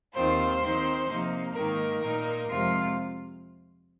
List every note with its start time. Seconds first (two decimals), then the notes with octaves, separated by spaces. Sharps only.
0.14 D#2 D#3 C4 F4 C5
0.61 D#3 C4 D#4
1.07 C3 F3 A#3 D#4
1.54 G#2 D#3 A#3 D#4 A#4
2.01 A#2 A#3 D#4
2.48 F2 C3 G#3 F4